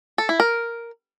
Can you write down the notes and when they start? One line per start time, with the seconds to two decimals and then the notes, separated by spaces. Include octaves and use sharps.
0.18 A4
0.29 E4
0.40 A#4